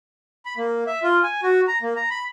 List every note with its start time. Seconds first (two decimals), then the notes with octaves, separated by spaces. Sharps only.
0.46 B5
0.57 A#3
0.87 E5
1.03 F4
1.23 G#5
1.43 F#4
1.68 A#5
1.82 A#3
1.96 A#5
2.10 B5